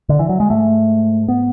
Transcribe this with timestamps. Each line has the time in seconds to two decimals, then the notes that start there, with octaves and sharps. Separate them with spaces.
0.09 D3
0.19 E3
0.29 F#3
0.40 G#3
0.50 G#2 A3
1.28 B3